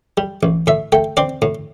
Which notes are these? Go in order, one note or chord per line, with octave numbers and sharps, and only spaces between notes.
G3
A1
A2 E5
A3 G5
C4 D5
A2